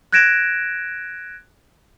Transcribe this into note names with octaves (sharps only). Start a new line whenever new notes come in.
F#6 G#6 A#6 D7 E7